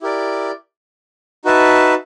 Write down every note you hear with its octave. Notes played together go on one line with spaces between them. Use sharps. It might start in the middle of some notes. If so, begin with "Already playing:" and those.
E4 G4 A#4 D5
D#4 F#4 B4 E5 A5